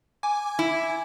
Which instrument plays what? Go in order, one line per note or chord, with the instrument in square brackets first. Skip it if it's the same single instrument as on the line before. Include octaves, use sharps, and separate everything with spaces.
[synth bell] G#5 D6 G#6
[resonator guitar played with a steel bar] E4